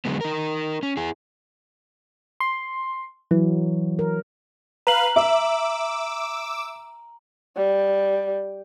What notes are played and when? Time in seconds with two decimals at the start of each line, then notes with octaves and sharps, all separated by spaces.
0.05 D3 F#3 G#3 B3
0.21 D#4 A#4
0.83 C#4
0.97 E4 G#4
2.40 C6
3.31 E3 F#3
3.99 A#4
4.87 B4 F5 A#5 F#7
5.16 E5 D6 E6
7.57 G3